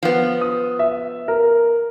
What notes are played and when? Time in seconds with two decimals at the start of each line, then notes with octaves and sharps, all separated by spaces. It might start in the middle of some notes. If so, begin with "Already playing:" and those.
0.03 F3 B3
0.41 D#6
0.79 E5
1.28 A#4